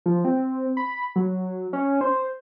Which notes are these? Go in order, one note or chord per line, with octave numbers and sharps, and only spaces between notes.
F3
C4
B5
F#3
C#4
C5